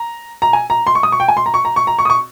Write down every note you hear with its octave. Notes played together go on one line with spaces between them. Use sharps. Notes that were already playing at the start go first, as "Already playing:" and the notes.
Already playing: A#5
A#5
G#5
A#5
C6
C#6
D#6
C#6
G5
G#5
C6
A#5
C#6
A#5
C#6
A#5
C#6
D#6
C#6